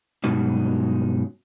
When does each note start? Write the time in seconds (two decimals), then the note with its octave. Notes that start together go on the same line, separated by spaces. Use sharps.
0.24 G2 B2 F#3 G#3 C#4 D#4